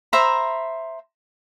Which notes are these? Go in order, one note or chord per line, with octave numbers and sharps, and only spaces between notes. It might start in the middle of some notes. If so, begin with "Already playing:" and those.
C5 E5 A#5 B5